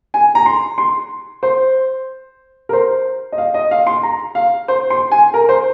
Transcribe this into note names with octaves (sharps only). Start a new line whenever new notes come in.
G#5
A#5
C6
C6
C5
A#4
C5
D#5
F5
D#5
F5
C6
A#5
F5
C5
C6
G#5
A#4
C5